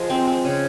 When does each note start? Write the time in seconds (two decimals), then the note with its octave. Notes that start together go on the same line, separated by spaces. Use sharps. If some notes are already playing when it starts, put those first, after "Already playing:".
Already playing: F3 G#3
0.10 C4
0.28 C4
0.45 C#3